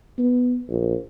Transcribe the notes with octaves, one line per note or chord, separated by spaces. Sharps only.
B3
A#1